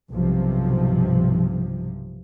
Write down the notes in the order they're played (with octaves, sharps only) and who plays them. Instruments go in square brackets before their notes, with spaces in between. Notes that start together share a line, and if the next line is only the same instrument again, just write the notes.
[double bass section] B1 G2 C3 F3